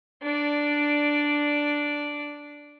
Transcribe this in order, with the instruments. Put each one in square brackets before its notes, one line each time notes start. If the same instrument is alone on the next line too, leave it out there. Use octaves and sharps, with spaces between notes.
[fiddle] D4 D5